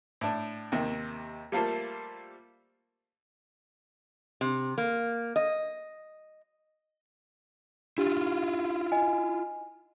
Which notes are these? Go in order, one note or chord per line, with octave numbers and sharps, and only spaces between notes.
A2 D4
D#2 C3 D#3
G3 A3 A#3 F4 A4 C5
C3
A#3
D#5
D4 E4 F4 G4
D#5 G#5